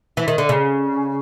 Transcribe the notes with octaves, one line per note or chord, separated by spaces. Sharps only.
E3
D#3
D3
C#3